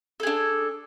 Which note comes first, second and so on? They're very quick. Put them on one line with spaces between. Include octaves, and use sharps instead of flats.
A4 G#4 D4